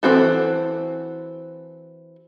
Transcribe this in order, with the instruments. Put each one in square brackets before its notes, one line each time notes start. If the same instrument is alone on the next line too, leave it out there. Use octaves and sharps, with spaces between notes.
[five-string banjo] E3 C4 F#4 A4